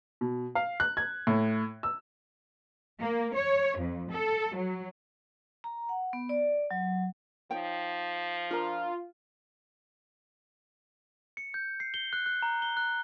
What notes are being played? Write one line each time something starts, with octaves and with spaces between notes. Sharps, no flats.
B2
F5
F#6
G#6
A2
E6
A#3
C#5
F2
A4
F#3
A#5
F#5
B3
D5
F#3
F3 D#4 C#5 G5
D4 F4 A#4 A#5
C#7
G6
C7
G7
F#6
F#6
A#5
G7
F#6